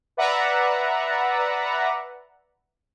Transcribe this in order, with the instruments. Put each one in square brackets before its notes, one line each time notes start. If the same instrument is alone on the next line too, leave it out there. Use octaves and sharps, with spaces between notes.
[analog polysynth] B4 D5 E5 F#5 A#5